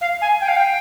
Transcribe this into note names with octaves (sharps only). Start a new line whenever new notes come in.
F5
G#5
G5
F5
G5